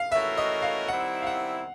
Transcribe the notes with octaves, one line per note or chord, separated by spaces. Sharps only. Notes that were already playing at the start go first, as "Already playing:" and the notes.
Already playing: F5
E3 A3 C#4 F#4 A#4 E5
D#5
F5
D#3 G3 C4 E4 F#5
F5
F#5